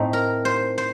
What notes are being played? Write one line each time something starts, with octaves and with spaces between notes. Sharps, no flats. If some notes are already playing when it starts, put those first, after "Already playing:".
Already playing: A2 A3 C4 D#4
A#4
C5
C5